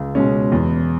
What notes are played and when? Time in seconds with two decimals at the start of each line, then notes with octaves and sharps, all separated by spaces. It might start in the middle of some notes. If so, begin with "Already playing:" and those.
Already playing: C#2
0.15 B2 G#3 C#4
0.52 E2